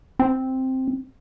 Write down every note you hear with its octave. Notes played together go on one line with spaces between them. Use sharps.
C4